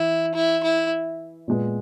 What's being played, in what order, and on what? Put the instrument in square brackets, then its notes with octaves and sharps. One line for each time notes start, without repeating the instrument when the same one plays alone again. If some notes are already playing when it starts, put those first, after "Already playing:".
Already playing: [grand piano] E3 [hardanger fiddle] E4
[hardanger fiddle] E4
E4
[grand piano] A#2 G#3 B3